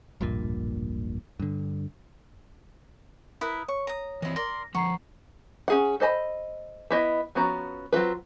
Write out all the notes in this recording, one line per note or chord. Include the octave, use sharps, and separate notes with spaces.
D1 A#1 G2 A#2
G2 D3
E4 A#4 B4 D#6
C#5 C#6
A#5 D#6
E3 C4 E4 D#5
A#4 D5 C6 A#6
D3 F3 F#5 A#5 C#6 C7
C#4 G#4 F#5
A4 C5 D#5 A5 B5
B3 E4 D#5
F3 B3 C#4 F#4 A#5
F#3 C4 F4 B4